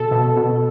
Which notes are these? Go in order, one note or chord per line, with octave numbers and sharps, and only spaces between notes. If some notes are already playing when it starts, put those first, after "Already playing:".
Already playing: B2 A4
B2
B2